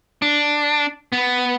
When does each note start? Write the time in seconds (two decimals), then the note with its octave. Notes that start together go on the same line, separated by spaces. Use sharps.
0.22 D4
1.12 B3